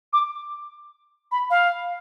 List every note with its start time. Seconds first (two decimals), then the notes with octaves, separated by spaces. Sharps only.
0.13 D6
1.32 B5
1.50 F5